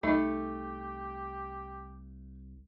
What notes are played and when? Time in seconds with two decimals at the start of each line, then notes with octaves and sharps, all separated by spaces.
0.03 C2 A3 D#4 G4 D#5